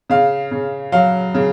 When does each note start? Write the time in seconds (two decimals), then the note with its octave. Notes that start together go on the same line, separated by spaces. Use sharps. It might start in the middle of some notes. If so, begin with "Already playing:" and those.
0.10 C#3 F5
0.51 C#3
0.92 F#3 F5
1.34 C#3